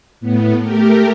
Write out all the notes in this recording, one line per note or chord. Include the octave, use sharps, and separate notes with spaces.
A2 B3
A3 G4 A#4